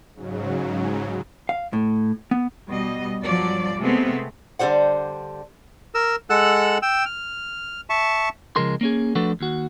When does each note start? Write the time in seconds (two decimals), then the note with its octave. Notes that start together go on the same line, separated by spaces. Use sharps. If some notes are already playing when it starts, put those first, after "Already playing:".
0.15 G#2 C#3 F#3
1.49 F5
1.73 A2
2.31 B3
2.67 B2 G3 D#5
3.24 G2 F3 F#3 D5
3.79 C3 G#3 A3 B3 C4
4.59 D3 G3 F#4 C5 F#5
5.95 A#4 E6
6.30 G#3 A4 F#5 E6 F#6
6.82 G5 E6
7.05 F6
7.90 E5 A5 C#6
8.56 C#3 F3 G#3 A#4 C6
8.81 A#3 C#4 G#4
9.15 F3 A3 D4 F#4 A4 B4
9.41 D#2 F#4